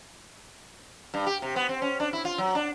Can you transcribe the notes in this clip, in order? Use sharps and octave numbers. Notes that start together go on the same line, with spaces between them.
G2
G4
C3
B3
C4
C#4
D4
E4
F4
F#3
D4